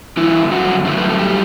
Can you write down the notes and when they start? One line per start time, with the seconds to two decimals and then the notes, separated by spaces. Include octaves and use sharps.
0.17 G2 D3 E3 E4
0.51 F#3 F#4
0.84 G2 D3 F#3 A3
0.98 B4
1.09 A4
1.19 G3 G4